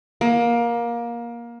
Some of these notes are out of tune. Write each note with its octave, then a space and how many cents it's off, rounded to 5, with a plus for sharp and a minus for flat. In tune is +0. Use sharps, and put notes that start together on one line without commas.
A#3 +20